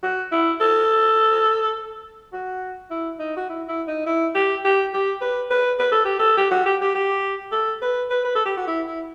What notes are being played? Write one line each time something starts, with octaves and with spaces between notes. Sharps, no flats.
F#4
E4
A4
F#4
E4
D#4
F#4
E4
E4
D#4
E4
G4
G4
G4
B4
B4
B4
A4
G4
A4
G4
F#4
G4
G4
G4
A4
B4
B4
B4
A4
G4
F#4
E4
E4